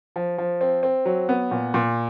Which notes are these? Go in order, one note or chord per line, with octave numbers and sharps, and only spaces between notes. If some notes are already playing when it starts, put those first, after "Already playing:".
F3
F3
C4
C4
F#3
B3
A#2
A#2